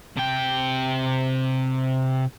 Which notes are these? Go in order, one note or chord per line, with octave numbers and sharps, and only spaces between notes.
C3 G5